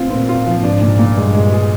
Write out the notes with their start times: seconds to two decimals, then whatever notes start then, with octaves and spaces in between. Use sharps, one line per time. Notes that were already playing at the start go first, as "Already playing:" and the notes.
Already playing: C4 F4
0.10 A#2 C4
0.29 F4
0.47 F3
0.63 G#2 D4
0.82 A#2
0.99 A#2
1.17 G2 G#3
1.35 G#3
1.53 G#4